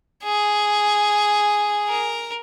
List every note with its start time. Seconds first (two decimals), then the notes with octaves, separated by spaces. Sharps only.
0.23 G#4
1.88 A#4